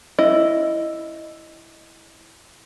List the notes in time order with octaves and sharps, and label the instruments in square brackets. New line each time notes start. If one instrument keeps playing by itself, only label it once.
[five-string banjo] E4 D#5